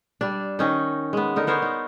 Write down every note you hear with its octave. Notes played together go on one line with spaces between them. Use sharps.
G3 D4
D#3 C#4 D#4
G#3 B3
D3 D#4 A#4
B3 A#4 C5 C#5
D#4